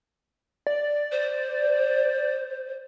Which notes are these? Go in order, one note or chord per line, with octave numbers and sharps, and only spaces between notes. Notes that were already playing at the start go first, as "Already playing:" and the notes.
D5
C5